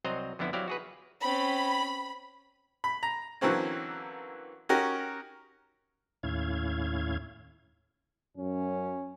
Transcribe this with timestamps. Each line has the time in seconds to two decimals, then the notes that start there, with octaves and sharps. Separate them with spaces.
0.04 C2 F#3 C4 C5 D#5 A#5
0.39 F2 D3 F3 B3 E4
0.53 F#3 C4 E4 G4 D5 F5
0.68 F#4 G#4 B4
1.21 C4 C#4 B5
2.84 B5
3.03 A#5
3.41 D3 E3 F#3 A#3 C4 C#4
4.69 C#4 D#4 F#4 G4 A#4
6.23 D#2 A2 C#4 E4 F5 G#6
8.37 F#2 C#4